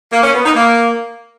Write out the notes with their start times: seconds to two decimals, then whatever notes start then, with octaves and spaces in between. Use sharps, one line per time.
0.12 A#3
0.23 C#4
0.34 B3
0.44 D#4
0.55 A#3